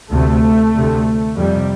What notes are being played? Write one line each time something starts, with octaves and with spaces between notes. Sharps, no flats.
D2 C3 A3
D2 C3
F2 C3 G3